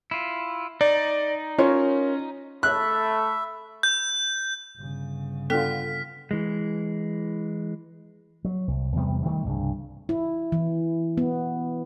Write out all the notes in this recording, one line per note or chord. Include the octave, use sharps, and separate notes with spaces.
E4 F4
D#4 D5
C#4 F4 A#4 C#5
A3 E5 B5 F#6
G6
G1 C#3
B3 D4 F4 A4 G5 F6 B6
E3 G#3
F#3
C2
E2 C3 G3 B3
D#3 G3 A3
C2 G2 C#3
E4
E3
B3